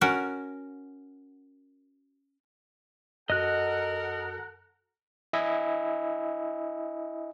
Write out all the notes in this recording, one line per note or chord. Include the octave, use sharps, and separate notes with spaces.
C#4 F#4 A#4 F#5
F#2 F#4 A4 A#4 D#5 F#5 F#6
E4 D#5 E5 G#5